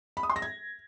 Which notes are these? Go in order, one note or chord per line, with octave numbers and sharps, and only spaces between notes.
B5
D#6
C6
A#6
G#6